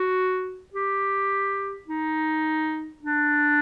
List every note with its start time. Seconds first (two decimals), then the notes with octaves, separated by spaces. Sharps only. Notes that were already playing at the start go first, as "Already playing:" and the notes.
Already playing: F#4
0.74 G4
1.88 D#4
3.03 D4